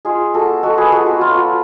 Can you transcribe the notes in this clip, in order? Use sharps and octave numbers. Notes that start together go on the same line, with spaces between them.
G#3 F4 G#4
B3 F4 F#4 A4
G#3 F#4 A4
G#4 B4
B3 F4 F#4 A4
F#4
F#3 F4
F4